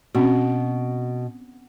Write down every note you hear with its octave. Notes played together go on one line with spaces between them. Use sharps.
B2 C4 C#4 F#4